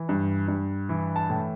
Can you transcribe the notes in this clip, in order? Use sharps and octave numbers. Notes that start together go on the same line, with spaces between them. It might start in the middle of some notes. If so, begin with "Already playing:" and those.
Already playing: E3
G2
G2
E3
A5
A2